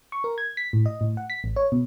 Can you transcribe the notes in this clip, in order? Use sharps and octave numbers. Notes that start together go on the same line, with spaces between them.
C#6
A#4
G#6
B6
A2
D#5
A2
F#5
B6
A1
C#5
B2